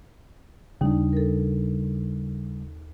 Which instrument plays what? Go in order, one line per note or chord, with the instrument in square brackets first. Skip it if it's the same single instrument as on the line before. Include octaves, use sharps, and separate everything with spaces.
[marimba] D#2 D#4 [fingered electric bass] C#3 G3 D4
[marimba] A4 A#4